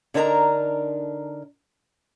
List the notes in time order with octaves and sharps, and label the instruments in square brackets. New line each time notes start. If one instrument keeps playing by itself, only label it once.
[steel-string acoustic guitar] D3 D4 D#4 A#4 D5 A#5